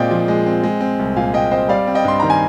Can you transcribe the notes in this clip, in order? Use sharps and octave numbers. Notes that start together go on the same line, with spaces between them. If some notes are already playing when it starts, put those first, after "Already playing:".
Already playing: A#2 G#3 C4 D5 D#5 F5 G5
F3
G#3
C4
G#3
C4
C2
A#2 F5 G#5
G#3 D#5 G5
C4 C5 D#5
G3 D5 F5
C4
D#5 G5
G2 C6
D#3 A#5
G#5